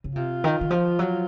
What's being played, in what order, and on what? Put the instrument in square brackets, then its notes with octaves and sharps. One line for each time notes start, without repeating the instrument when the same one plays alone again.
[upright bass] C#3
[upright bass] C3 [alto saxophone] F4
[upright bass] D#3
D#3
F3
F#3